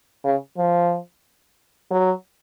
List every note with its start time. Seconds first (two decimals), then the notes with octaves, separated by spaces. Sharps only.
0.25 C#3
0.58 F3
1.91 F#3